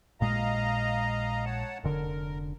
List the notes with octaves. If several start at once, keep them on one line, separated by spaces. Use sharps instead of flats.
A#1 A#2 G#3 D#5 F5 A#5
C#5 F#5 A5
F1 D3 A#4